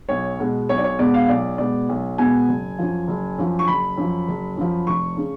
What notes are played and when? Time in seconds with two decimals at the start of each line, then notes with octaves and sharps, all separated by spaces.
0.09 B1 C#5
0.39 B2 G#3 B3
0.69 B1 C#5
0.78 D5
0.84 C#5
0.99 B2 G#3 B3 D5
1.14 F5
1.25 F5
1.29 B1 D5
1.58 B2 G#3 B3 D5
1.89 B1
2.18 B2 G#3 B3 G#5
2.48 F#1
2.78 F#2 F3
3.07 F#1
3.38 F#2 F3
3.59 C#6
3.68 F#1 B5
3.97 F#2 F3
4.28 F#1
4.57 F#2 F3
4.87 F1 C#6
5.17 C#3